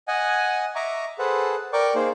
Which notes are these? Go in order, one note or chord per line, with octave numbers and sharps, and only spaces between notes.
D#5 F#5 G#5
D#5 E5 A#5 C#6 D6
G#4 A4 B4 C5 F#5 A5
A#4 D5 G5 C#6 D6
A#3 D#4 G#4 C5